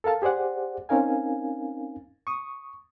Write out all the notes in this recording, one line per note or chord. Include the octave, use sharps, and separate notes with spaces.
A4 A#4 F5 A5
G4 G#4 C5 D5 F#5
C4 C#4 D#4 A#4 F5 G#5
C#6 D#6